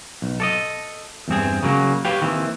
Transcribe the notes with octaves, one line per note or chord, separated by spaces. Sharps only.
B1
A4 D5 D#5
E2 G2 C4 G#4
C#3 F#3 A#3
G4 B4 C#5 F5 G5
D#2 D#3 E3 C4